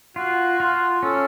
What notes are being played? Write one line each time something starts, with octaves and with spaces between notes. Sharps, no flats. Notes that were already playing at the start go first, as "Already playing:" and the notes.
F4 F#4
F4
C#4 A4